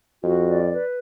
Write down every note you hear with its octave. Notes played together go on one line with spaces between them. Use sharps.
F2 F#4
D5
B4